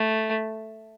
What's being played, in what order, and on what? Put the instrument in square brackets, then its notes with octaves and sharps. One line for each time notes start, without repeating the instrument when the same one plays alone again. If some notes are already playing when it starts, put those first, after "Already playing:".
Already playing: [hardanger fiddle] A3